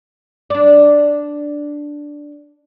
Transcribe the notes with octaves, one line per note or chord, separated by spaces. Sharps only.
D4 D5